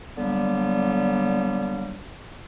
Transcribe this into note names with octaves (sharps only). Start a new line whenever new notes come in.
D3 F#3 G3 A#3 B3